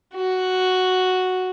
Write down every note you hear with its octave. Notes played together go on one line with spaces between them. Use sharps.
F#4